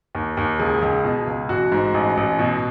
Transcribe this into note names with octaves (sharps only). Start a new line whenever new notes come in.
D#2
D#2
C#2 G#4
C#2
B2
C#2
A1 F#4
G#2
A1
A1
B2